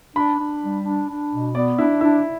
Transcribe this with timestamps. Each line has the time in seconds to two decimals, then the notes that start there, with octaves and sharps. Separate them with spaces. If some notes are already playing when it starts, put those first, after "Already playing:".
0.16 D4 B5
0.39 D4
0.62 G3
0.85 D4
1.08 D4
1.32 B2
1.54 B3 D5
1.78 D4 E4
2.01 D4 E4